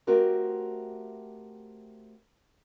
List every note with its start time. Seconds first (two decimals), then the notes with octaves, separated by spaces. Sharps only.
0.07 A3 C4 F#4 G4 A#4 F5